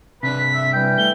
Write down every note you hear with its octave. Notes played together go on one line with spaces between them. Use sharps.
C3 D4 B4 B6
E5
E3 G3 G5
A3 G7